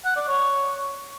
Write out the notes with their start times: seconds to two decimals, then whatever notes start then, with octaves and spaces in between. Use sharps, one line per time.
0.05 F#5
0.16 D5
0.28 C#5